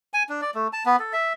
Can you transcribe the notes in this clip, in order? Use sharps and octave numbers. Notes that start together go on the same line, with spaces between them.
G#5
D4
D5
A3
A5
B3
A4
E5